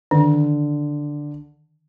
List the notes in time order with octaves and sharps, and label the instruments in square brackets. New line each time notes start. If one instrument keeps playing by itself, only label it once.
[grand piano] D3 [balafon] D#3